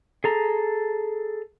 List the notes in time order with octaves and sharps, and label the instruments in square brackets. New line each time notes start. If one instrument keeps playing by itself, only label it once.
[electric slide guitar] G#4 A4 A#5